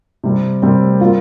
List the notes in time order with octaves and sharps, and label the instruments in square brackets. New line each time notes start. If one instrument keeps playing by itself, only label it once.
[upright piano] C3 G3 C4
C3 G3 C4
G3 A#3 F4 A#4